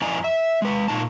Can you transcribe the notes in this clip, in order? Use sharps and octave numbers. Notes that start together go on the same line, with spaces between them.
F2 E4 D5 D#5 G#5 A#5
E5
G#3 B4
A#2 D#4 A5